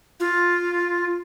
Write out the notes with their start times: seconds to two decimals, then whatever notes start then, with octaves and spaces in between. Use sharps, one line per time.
0.20 F4